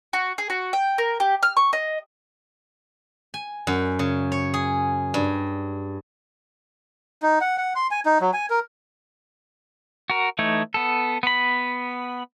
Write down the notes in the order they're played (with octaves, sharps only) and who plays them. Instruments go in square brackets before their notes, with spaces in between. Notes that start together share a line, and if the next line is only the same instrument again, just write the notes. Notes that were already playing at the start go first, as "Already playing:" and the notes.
[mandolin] F#4
G#4
F#4
G5
A#4
G4
F6
C#6
D#5
[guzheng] G#5
F#2
C#3
C#5
G#4
G2
[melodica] D#4
F#5
F#5
C6
G#5
D#4
F#3
G#5
A#4
[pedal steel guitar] F#4 A#4
E3 A3 D#4 C#5
B3 A4
B3 B5